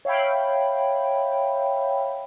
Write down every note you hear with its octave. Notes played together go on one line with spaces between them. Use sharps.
C#5 E5 F5 G5 B5